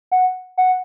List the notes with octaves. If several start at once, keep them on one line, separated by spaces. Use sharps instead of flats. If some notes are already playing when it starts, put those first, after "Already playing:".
F#5
F#5